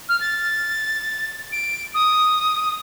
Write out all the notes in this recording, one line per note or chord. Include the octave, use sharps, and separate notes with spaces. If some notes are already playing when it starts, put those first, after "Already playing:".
F6
A6
D7
D#6